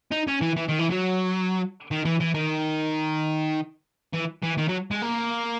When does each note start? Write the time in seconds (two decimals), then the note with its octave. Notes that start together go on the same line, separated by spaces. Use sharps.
0.12 D#4
0.28 C#4
0.41 E3
0.56 E3
0.68 D#3
0.79 E3
0.90 F#3
1.91 D#3
2.05 E3
2.20 E3
2.34 D#3
4.14 E3
4.43 E3
4.58 D#3
4.69 F#3
4.91 G#3
5.02 A#3